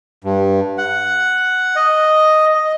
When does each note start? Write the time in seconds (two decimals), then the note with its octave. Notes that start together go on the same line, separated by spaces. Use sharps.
0.24 G2
0.78 F#5
1.76 D#5
2.55 D#5